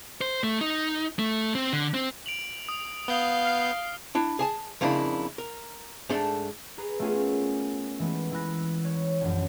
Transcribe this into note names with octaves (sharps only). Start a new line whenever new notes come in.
C5
A3
D#4
A3
C4
D3
C4
D7 F7 F#7
D#6
B3 F5 G6 G7
F6 C7
D4 E4
G#4 G#5 A5
F2 C#3 A#3 D4 E4
A#4
G#2 A3 D4 A4
G#4 B4 A#5
A3 B3 C#4 F4 G#4 A#4
E3 G#3 A3 B3
E3 E4 B5 F#6 A#6
C#5
A#1 F#2